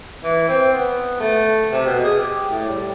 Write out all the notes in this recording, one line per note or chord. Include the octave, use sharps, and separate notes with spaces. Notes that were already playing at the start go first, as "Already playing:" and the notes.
E3
C4
B3
A3
C3
B2
G#4
G4
A2
G3